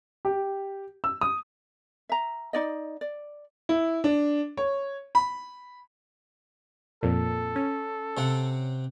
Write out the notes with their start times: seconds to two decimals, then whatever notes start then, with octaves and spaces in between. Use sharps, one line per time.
0.25 G4
1.04 E6
1.21 D#6
2.09 E5 A#5
2.53 D#4 D5 D#5
3.01 D5
3.69 E4
4.04 D4
4.57 C#5
5.15 B5
7.03 F2 A#2 A4
7.56 C#4
8.17 C3 C4 F#5